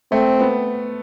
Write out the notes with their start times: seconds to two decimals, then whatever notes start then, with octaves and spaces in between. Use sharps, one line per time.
0.12 A3 C4
0.41 B3